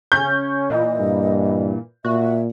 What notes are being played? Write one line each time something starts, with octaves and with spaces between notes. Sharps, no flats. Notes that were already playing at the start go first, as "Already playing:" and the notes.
C#3 C#4 G6
A#2 E3 D#5
G2
A#2 F#4 E5